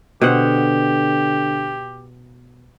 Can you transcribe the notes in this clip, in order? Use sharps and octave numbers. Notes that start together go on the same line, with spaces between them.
B2 D3 G4 C5 F#5